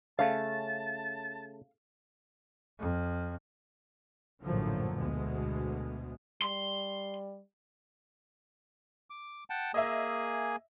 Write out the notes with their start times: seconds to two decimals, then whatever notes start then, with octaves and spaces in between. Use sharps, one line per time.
0.19 C#3 A3 F5 A5
2.79 F2
4.42 A#1 F#2 A2 D3 F3 F#3
4.98 D2 B2 G#3
6.42 G3 C6
9.10 D6
9.50 F#5 G5 A5
9.74 A#3 G#4 D#5 E5 G#5